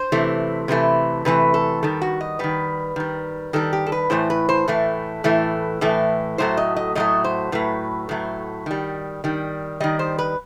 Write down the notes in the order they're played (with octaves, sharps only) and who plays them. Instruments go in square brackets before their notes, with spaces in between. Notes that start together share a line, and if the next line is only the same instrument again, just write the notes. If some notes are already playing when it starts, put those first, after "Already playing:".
Already playing: [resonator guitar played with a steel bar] C5
C3 E3 A3
C3 E3 A3 B4
C3 E3 A3 B4
A4
D#3 G3 A4
F#4
D#5
D#3 G3 B4
D#3 G3
D#3 G3 A4
G4
A4
B4
A2 E3 A3 C5
B4
C5
A2 E3 A3
A2 E3 A3
A2 E3 A3
A2 F#3 A3 C5
D#5
D#5
A2 F#3 A3 D#5
C5
A2 F#3 A3 B4
A2 F#3 A3
D#3 G3
D#3 G3
D#3 G3 D#5
C5
B4